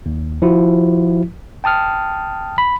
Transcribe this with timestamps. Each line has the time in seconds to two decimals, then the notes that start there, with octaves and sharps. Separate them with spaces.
0.06 D#2
0.42 F3 E4 F#4
1.64 G5 A5 D#6 F6
2.58 B5